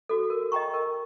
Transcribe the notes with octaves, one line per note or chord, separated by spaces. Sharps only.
F#4 A4
A#4
D#5 G5 A#5 C#6
A#4